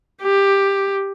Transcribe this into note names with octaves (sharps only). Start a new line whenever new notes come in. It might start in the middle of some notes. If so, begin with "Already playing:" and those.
G4